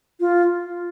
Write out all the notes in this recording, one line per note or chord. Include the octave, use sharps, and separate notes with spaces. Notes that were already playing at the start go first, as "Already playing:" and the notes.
F4